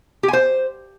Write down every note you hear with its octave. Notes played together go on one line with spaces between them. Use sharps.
G4
G#5
C5